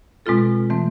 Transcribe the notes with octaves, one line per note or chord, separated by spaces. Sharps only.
B2 G#3 C4 F4 A4
E3 A3 C4